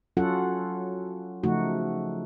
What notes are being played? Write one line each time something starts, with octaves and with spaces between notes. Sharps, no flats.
F#3 C#4 F4 F#4 A4 F#5
C#3 F3 A3 D#4 F#4